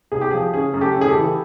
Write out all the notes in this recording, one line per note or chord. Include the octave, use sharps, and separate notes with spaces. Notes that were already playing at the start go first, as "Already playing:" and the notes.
C2 G#4
G4
F3 G#4
C#3 G#4
F#2
G4 A4
C#3
G#4
G4 A4
E3